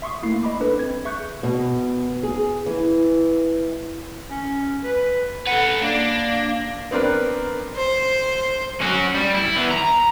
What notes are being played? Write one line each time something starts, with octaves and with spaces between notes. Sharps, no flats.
E5 C6 C#6 D#6
A3 A#3 E4 C7
D#5 B5 D6
D4 A4 B4
C4 G#6
G#4 E5 C#6 F#6 G6 C#7
B2
G#4
E3
C#4
B4
A4 B4 F#5
A#3 D4
B3 C4 D4 A#4 B4
C5
C#4 F#4
G3
E4
E3 B3
A#5